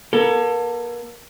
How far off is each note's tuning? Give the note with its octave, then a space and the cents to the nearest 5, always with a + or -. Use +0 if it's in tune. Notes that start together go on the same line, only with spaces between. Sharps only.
A#3 +40 A4 +25